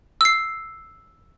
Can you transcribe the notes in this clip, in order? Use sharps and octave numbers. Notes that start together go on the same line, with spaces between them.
E6 C7